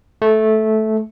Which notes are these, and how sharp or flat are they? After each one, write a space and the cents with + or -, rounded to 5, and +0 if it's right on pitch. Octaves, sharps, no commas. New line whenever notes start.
A3 -10